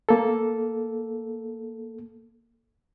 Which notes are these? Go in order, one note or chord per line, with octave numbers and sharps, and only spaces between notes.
A#3 A4